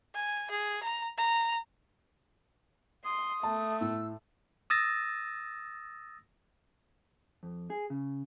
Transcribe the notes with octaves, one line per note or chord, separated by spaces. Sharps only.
G#5
G#4
A#5
A#5
C6 D#6
A3 A5
A2 E6
D#6 E6 A6 A#6
F2
G#4
C#3